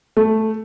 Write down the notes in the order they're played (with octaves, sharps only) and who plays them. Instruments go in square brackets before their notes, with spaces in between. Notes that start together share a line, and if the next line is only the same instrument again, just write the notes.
[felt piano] A3